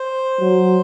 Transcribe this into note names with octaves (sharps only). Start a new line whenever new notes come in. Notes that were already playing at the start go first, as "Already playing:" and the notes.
Already playing: C5
F#3